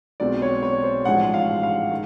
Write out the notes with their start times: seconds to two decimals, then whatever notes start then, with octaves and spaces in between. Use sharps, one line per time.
0.20 B1 B2 G#3 C4 D5
0.42 C#5
0.62 C#5
0.84 C5
1.05 A1 G#2 F3 G#3 F#5
1.34 F5
1.63 F5
1.91 D#3